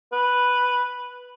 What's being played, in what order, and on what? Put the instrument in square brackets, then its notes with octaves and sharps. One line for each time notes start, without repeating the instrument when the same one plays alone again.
[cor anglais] B4